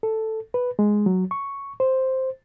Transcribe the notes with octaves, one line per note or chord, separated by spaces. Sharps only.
A4
B4
G#3
F#3
C#6
C5